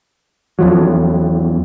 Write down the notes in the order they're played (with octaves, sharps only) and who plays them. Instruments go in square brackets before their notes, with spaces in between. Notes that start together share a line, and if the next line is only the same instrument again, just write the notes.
[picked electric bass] E2 F3 F#3